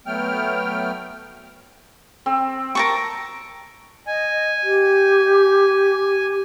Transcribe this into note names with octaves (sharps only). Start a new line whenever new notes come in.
F#3 A3 B3 G5 F6
C4
A#4 A5 C#6
D#5 G#5
G4